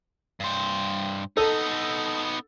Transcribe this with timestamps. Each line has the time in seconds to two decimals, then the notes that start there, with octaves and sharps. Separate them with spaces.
0.40 G2 C5
1.37 B3 D#4 A4